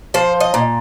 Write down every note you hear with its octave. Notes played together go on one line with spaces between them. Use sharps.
F3 C5
D#5
A#2